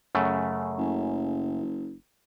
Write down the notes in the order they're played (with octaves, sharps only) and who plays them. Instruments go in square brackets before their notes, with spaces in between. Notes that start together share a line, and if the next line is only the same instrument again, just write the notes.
[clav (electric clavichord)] F#2 C#3 A3
[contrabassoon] F#1